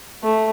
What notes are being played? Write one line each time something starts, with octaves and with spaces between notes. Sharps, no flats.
A3